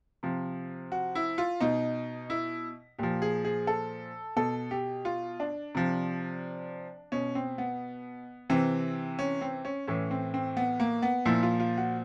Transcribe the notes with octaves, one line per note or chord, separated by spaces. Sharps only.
C3 F3
F#4
E4
F4
B2 D#4
E4
A#2 F3 G4
G#4
G#4
A4
B2 A4
G4
F4
D4
C3 F3
B2 C#4
C4
B3
C3 E3 C4
C#4
C4
C#4
A2 E3 C#4
C4
C4
B3
A#3
B3
A#2 F3 E4
F4
F4
F#4